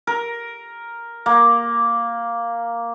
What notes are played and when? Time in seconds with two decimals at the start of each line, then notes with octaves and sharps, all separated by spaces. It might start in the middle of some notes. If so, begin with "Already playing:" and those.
0.07 A#4
1.26 A#3